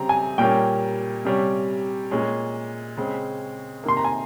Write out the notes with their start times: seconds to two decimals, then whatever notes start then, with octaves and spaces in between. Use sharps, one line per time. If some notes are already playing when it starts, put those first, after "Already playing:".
Already playing: C#3 G3 C4 A#5
0.09 G#5
0.38 A#2 G3 A#3 C#4 G5
1.25 C3 G3 C#4
2.11 A#2 G#3 C#4
2.97 C#3 G#3 C4
3.84 C3 D#3 A#3 C6
3.97 A#5
4.05 G#5